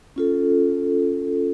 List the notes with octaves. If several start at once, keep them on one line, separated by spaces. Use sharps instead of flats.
C#4 F4 A4